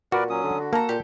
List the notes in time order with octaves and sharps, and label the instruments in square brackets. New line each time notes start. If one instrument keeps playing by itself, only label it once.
[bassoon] A#2 [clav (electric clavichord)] F#4 [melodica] A#4 B4 D5
[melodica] F#3 C#4 D#6
[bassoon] D3
[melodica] F#4
[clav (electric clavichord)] A#3 [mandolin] A4 A#5
[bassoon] A#2 [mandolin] G4 A4